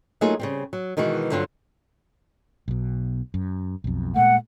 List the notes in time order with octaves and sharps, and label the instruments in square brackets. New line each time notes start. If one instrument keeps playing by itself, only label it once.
[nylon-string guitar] F#3 A3 A#3 D#4 F4 G#4
C#3 G3 C4
F#3
B2 D#3 E3 G#3 F#4
G2 D3 F#3 C4 F4
[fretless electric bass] B1 B2
F#2
B1 F2
[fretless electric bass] A#2 G#3 A3 [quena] F#5